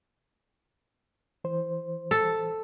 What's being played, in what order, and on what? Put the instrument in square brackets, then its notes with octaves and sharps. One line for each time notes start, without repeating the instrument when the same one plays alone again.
[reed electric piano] E3 C5
[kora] A4